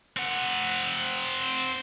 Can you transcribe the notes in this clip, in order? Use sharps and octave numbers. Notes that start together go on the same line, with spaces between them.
C4 F#5